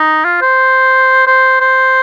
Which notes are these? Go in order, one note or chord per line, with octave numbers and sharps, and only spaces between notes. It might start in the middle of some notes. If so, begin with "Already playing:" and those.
Already playing: D#4
F4
C5
C5
C5